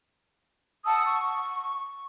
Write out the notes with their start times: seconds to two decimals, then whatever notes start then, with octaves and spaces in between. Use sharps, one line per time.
0.85 F#5 A5 D#6 E6
1.05 C#6